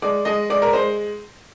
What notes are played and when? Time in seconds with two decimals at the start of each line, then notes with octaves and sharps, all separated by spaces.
0.02 G#3 D5
0.25 G#3 D#5
0.50 G#3 D5
0.62 A#4
0.73 G#3 C5